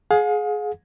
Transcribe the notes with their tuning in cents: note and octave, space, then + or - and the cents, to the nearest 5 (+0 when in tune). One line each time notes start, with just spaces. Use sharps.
G#4 +20 F5 +45